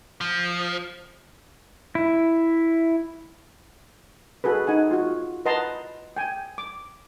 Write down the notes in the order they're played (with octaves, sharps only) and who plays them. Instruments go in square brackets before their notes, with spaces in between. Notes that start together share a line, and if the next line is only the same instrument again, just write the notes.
[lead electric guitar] F3
[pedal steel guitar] E4
[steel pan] F#4 G#4 A4 B4
D#4 F#5 G#5
F4 F#4
B4 D#5 F#5 A5 A#5 C6
G5 G#5
D6